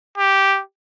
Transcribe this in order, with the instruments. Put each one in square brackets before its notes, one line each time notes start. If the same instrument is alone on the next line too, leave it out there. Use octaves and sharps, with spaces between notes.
[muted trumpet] G4